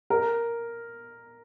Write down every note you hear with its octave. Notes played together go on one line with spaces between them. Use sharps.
A#4